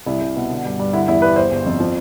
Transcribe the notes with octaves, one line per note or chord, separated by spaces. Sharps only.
C2 E4
C2
B2
D3
G2
G2
D3 E4
E2 E4
G3 B4
G1 C5
G1
F2
F3